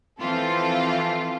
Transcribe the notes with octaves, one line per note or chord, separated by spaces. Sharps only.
E3 F3 C4 F4 A4